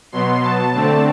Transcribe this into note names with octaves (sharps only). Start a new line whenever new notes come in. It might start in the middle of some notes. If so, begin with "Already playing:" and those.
B2 F#3 B3 C6
A5
D3 A3 C4